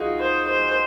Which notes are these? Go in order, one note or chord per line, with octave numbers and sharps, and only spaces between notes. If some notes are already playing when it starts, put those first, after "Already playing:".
Already playing: D#4 F4 F#4 G#4
C5
C5